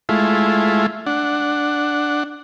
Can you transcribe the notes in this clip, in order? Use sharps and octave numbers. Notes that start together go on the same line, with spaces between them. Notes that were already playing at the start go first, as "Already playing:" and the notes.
G#3 A3 E4 F4
D4 F#5